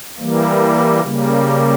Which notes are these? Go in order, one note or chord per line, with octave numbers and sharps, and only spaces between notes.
E3 G3 A#3
C#3 G3 A#3